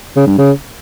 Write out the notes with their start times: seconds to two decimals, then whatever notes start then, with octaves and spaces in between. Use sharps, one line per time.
0.16 C#3
0.27 G2
0.38 C#3